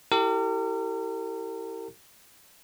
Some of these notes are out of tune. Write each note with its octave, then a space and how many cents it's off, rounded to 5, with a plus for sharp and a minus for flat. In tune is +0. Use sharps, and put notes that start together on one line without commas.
E4 +0 G4 -10 A#4 -40